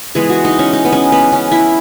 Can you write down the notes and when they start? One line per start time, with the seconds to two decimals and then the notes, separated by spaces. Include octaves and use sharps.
0.15 E3 G#3 B3 G#4
0.30 F#4
0.45 D#4
0.59 C#4
0.73 D#4
0.85 B3
0.93 C#4
1.12 B3
1.32 C#4
1.52 E4